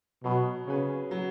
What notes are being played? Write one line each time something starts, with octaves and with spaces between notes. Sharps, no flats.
B2 F#3
C#3 C#4 G#4 B4
F#3